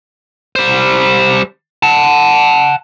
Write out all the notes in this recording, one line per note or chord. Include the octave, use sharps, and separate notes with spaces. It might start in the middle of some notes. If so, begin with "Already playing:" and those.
G3 C5
F#5 A5